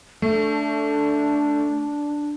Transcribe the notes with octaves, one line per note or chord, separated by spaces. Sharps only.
A3 D4